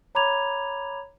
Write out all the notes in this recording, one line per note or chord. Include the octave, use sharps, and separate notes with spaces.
C#5 A#5 B5 D6 G#6 F7